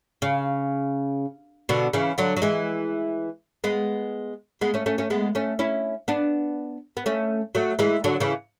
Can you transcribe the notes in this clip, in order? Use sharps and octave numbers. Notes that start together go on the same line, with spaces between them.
C#3
B2 D3
C#3 E3
D3 F#3
F#3
E3 G#3
G#3 B3
G#3 B3
A3 C#4
A3 C#4
A3 C#4
G#3 B3
A3 C#4
C#4 E4
B3 D4
B3
A3 C#4
F#3 A3
E3 G#3
D3 F#3
C#3 E3